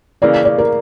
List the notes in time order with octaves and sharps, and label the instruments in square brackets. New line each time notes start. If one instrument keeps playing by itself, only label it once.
[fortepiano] C#3 E3 A#3 [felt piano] D5
[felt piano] D5
A#4